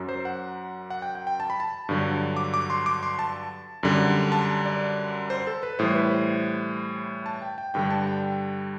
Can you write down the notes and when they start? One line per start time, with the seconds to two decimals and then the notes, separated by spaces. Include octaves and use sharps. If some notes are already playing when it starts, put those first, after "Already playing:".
Already playing: F#2 F#3
0.09 C5
0.25 F#5
0.90 F#5
1.02 G5
1.15 G5
1.27 G5
1.40 A5
1.50 B5
1.60 A5
1.89 G2 D3 F#3
2.36 D6
2.54 D6
2.70 C6
2.86 D6
3.03 C6
3.19 A5
3.83 F#2 D3 G3
4.32 A5
4.66 D5
5.30 C5
5.47 A4
5.63 B4
5.79 A2 E3 G3 C5
5.95 B4
6.11 C5
7.26 A5
7.42 G5
7.58 G5
7.74 G2 D3 G3 G5
7.90 A5
8.07 G5